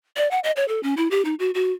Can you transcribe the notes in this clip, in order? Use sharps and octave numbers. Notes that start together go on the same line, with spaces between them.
D5
F#5
D#5
C#5
A4
C#4
E4
G4
D#4
F#4
F#4